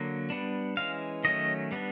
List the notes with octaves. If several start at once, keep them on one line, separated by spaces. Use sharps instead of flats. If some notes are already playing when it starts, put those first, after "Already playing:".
Already playing: D3 F#3 A#3
G3 B3 D4
E3 G#3 C#4 F5
D#3 F#3 A3 C#4 D#5
G3 B3 D4